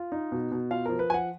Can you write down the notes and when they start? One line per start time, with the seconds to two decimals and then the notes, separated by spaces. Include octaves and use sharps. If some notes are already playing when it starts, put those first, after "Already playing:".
Already playing: F4
0.12 D#4
0.32 B2
0.52 B2
0.71 F4 F5
0.86 F3 A#4
0.99 B4
1.10 F3 F#5 G#5